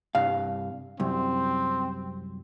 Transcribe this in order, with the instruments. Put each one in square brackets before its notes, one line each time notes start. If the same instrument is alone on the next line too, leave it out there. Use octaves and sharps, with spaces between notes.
[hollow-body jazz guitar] C2 G2 F5
[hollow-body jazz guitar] C2 F#2 [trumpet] C4